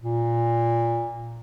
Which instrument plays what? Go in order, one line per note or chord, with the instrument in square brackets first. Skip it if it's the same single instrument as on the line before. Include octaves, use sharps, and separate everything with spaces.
[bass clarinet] A#2